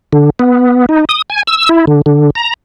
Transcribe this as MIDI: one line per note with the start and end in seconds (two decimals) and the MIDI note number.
0.13 0.30 50
0.39 0.86 59
0.89 1.05 63
1.09 1.22 87
1.30 1.43 80
1.47 1.69 88
1.69 1.85 64
1.87 2.01 50
2.06 2.30 50
2.35 2.54 82